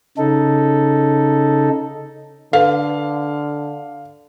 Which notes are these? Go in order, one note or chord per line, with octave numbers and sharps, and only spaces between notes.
C#3 D#4 A4
D3 A4 B4 F5